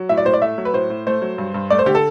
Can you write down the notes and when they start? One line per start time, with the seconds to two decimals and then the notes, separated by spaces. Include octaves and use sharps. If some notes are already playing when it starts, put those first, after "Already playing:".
Already playing: F#3
0.09 A2 E5
0.18 D5
0.25 A2 C5
0.34 D5
0.42 A3 E5
0.58 F#3
0.65 B4
0.74 A2 C5
0.90 A2
1.07 A3 C5
1.22 F#3
1.38 G2
1.54 G2
1.70 A3 D5
1.79 C5
1.86 D3 G4
1.95 A4